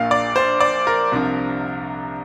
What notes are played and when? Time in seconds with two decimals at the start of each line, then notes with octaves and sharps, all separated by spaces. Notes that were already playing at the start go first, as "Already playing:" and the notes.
Already playing: A#1 A#2 A#3 D4 F5
0.11 D5
0.36 C5
0.60 D5
0.87 A#4
1.12 C2 C3 F3 D4